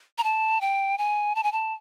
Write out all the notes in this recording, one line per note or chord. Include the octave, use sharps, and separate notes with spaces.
A#5
A5
G5
G#5
A5
G#5
A5